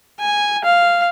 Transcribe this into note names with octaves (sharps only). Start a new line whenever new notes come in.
G#5
F5